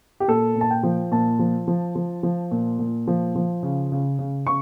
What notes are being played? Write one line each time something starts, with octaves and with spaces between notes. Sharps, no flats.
G4
A#2 A4
A#2
A5
G5
F3
A#2 A5
F3
F3
F3
F3
A#2
A#2
F3
F3
C#3
C#3
C#3
C#3 C#6